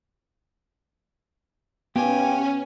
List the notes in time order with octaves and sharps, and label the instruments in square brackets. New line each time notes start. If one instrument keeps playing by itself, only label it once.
[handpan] B3 [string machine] C#4 [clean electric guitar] G4 F5 G5 [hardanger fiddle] G#5